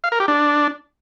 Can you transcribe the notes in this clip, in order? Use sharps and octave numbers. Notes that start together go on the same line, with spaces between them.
F5
A#4
G4
D4